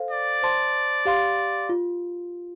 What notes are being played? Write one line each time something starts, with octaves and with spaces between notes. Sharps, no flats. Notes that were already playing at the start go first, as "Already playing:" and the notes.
Already playing: A4 C5 F5
D5
C5 A5 C6
G4 F5 C6
F4